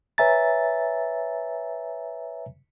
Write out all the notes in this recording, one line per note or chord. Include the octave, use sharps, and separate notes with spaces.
B4 C#5 E5 G#5 A#5 A6